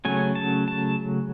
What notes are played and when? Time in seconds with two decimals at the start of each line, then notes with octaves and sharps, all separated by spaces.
0.05 C#3 F#3 A3 C#4 G#5
0.35 A5
0.68 A5